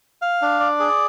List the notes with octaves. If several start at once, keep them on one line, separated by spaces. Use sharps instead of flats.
F5
D4
D5
G#4